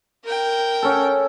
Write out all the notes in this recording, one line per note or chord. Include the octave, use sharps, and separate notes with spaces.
A#4 G5
C#4 A4